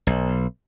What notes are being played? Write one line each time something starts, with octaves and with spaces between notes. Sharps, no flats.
B1